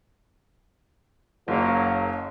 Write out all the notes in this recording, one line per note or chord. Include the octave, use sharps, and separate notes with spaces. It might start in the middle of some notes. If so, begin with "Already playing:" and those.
F#1 F#3 A#3 C#4